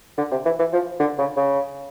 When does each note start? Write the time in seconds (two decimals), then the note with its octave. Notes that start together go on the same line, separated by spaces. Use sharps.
0.18 D3
0.31 C3
0.45 E3
0.59 E3
0.73 F3
1.00 D3
1.19 C#3
1.37 C#3